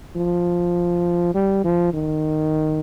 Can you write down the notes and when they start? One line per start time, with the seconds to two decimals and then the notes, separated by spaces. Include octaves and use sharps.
0.16 F3
1.34 G3
1.65 F3
1.93 D#3